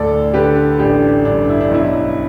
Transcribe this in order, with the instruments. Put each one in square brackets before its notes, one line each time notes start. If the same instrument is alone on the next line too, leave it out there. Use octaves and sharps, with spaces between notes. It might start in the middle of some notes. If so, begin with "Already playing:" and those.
Already playing: [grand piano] D2 A2 A4 D5
D3 G4 B4
A1 D4 G4
G2 D4
E4
D4
B1 E4